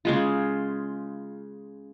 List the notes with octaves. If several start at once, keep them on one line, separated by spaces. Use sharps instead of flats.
C#3 G#3 F4